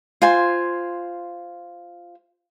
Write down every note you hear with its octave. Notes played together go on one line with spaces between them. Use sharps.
F4 C5 G#5